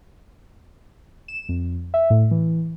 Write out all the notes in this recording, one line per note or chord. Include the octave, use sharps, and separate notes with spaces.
E7
F2
E5
A2
E3